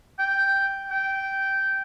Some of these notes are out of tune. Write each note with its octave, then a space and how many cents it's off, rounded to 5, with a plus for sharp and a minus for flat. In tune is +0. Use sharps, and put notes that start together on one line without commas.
G5 +0
G5 -10